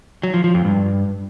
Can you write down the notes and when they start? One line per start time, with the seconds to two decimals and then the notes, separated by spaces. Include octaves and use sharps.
0.23 F#3
0.34 F3
0.44 F3
0.54 F2
0.65 G2